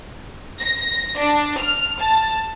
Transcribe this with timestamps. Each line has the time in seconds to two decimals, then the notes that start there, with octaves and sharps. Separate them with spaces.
0.61 A#6
1.19 D4
1.61 F6
2.01 A5